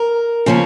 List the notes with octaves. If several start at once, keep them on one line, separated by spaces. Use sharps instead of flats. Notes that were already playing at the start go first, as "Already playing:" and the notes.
Already playing: A#4
C#3 F3 A#3 C#4